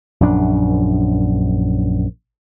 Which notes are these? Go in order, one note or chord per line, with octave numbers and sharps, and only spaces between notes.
A#1 F#2 D4